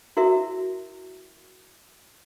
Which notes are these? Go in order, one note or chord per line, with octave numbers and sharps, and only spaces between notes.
E4 F#4 A#4 E5